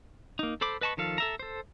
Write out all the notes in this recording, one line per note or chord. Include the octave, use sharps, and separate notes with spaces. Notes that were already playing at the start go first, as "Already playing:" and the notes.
A#3 D#4
A4 C5 B5 D6
B4 D#5 A5 B5 C#6
D#3 F3 A4 F5
A4 E5 A#5
A4 C5